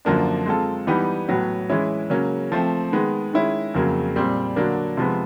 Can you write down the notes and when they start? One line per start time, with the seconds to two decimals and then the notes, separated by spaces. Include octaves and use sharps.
0.05 F#2 D3 F3 A#3 D4
0.46 G#3 C4 F4 A4
0.87 E3 G3 B3 D#4 G4
1.28 A2 F#3 B3
1.70 E3 G#3 C#4 E4
2.10 C#3 F#3 A#3 C#4
2.52 F3 A3 C4
2.92 D#3 G#3 B3
3.33 D#3 G#3 C#4 E4
3.74 F2 C#3 F#3 A#3
4.16 A#2 G3 C4
4.56 D3 F#3 A#3 D4
4.97 C3 F3 G#3 B3